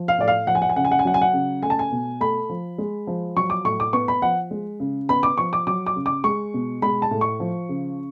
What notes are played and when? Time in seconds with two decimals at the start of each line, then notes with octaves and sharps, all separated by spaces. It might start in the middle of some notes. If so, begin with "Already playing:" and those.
Already playing: F3
0.08 F5
0.18 A2 D5
0.28 F5
0.47 F3 F#5
0.55 G#5
0.62 F#5
0.69 G#5
0.76 C#3 F#5
0.85 G#5
0.91 F#5
0.99 G#5
1.05 F#3 F#5
1.14 G#5
1.22 F#5
1.33 C#3
1.63 A3 G#5
1.70 A5
1.79 G#5
1.92 B2
2.21 A3 B5
2.49 F3
2.78 G#3
3.07 F3
3.37 F#3 C#6
3.50 D6
3.65 A2 C#6
3.80 D6
3.93 B3 C#6
4.08 B5
4.22 F3 F#5
4.51 G#3
4.80 C#3
5.09 B3 B5
5.23 D6
5.38 F3 C#6
5.53 D6
5.67 F#3 D6
5.87 D6
5.96 C#3
6.06 D6
6.24 G#3 C#6
6.54 B2
6.82 G#3 B5
7.02 A5
7.11 A2
7.21 C#6
7.40 F3
7.69 C#3